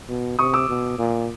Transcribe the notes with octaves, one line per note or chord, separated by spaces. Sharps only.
B2
C3 C#6 D#6
D6 E6
B2
A#2